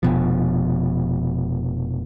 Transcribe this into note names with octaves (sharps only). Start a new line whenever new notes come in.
F1 B2 F3